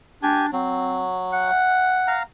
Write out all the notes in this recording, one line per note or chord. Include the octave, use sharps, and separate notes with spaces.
D4 G4 G#5
F#3 C4
F#5
F5 A#5